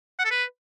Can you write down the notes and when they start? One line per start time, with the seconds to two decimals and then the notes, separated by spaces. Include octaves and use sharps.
0.19 F#5
0.25 A4
0.31 B4